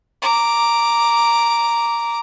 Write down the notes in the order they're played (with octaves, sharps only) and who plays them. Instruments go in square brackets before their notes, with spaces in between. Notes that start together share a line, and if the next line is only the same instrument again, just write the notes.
[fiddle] A#5 D6